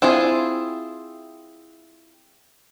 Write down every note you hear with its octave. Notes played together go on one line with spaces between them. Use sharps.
C4 E4 F4 G#4